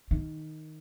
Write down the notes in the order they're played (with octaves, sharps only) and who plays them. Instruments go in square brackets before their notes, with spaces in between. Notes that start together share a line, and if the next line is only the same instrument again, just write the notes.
[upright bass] D#3